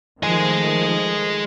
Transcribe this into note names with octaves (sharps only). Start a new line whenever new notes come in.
D#3 F3 G#3 A3 G#4